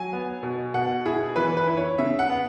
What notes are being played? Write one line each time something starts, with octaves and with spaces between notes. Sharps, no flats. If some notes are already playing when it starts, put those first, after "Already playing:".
Already playing: F#3 G#5
B3
B2
B2 F#5
E4 G#4
E3 B4
B4
E4
C#5
C#3 E5
F#5
B3